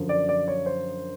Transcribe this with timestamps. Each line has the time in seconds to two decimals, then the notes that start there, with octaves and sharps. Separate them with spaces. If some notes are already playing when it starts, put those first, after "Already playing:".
Already playing: F#2 D3 F3
0.09 D5
0.29 D5
0.48 C#5
0.66 C5